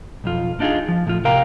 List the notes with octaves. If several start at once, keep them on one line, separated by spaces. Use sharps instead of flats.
B1 F2 F4
D4 D#4 F4 F#4 G#4
F3
A2 F3 F4
C3 A#4 F5 G5 A#5